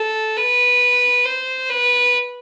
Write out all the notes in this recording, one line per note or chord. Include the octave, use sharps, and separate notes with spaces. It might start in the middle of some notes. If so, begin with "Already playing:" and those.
Already playing: A4
B4
C5
B4